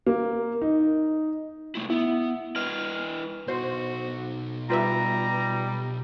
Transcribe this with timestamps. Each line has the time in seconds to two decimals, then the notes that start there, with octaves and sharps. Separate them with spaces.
0.07 A#3
0.62 D#4
1.75 C3 A3 E4
1.90 B3 E4
2.56 E4 B4 D#5 F6
3.48 B2 D#4 F#4 C5
4.70 G3 F4 B4 E5 A#5